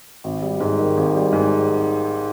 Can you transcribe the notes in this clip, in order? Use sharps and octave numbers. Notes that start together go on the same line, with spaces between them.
G#1
G3
G#2
D#3
G#1
G3
G#2